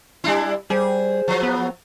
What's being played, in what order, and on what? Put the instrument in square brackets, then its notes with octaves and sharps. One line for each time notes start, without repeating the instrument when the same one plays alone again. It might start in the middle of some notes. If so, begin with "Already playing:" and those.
[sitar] G3 D4 E4
[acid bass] G3 [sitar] G#4 [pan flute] C5
[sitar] F3 F#3
[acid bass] B3